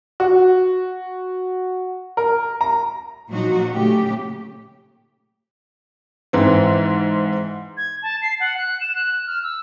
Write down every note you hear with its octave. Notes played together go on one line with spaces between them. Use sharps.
F#4
A#4
A#5
A#2 F3 F#3 D#4 F#4
A#2 C#3 A3 G4
G#2 E3 C4
G#6
A5
C7
F#5
F#6
E7
F#6
F6
E6